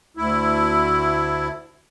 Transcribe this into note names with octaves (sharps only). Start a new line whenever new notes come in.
D2 E4